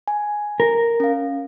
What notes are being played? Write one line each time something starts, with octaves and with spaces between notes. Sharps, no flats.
G#5
A#4
C#4 F5